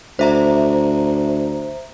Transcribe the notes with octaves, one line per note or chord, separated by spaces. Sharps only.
D2 C5 E5 A#5